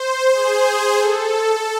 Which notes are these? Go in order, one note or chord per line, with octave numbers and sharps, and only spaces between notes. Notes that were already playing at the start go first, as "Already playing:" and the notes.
Already playing: C5
G#4
A4